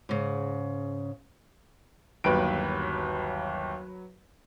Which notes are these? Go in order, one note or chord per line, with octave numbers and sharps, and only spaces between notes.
G#2 C#3
G1 D#2 F#3 B4 D7